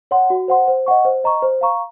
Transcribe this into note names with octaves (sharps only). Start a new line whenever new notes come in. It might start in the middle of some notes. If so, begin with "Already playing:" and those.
C#5 F#5 C6
F#4
C5 F#5 C6
C5
D#5 F#5 C#6
C5
D#5 A#5 C#6
C5
F5 A#5 C#6